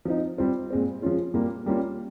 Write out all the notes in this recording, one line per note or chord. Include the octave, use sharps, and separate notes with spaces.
F3 C4 D#4
G3 C4 F4
A#2 G#3 C4
F3 G#3 C#4 F4
A#2 G3 A#3 F4
G3 A#3 C#4 F4